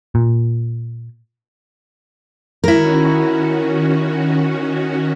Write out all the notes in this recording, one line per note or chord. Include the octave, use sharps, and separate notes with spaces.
A#2
D#3 C#4 E4 F#4 A#4